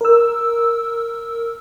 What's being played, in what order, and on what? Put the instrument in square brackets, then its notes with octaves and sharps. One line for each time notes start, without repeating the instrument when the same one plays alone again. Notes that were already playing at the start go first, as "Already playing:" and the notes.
[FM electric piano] A#4 E6